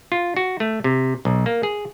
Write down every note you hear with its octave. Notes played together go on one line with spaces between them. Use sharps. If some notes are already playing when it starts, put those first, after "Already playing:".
F4
F#4
A3
C3
B1
A#3
G#4